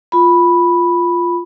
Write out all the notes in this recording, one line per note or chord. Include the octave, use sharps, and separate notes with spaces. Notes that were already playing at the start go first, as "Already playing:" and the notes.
F4 B5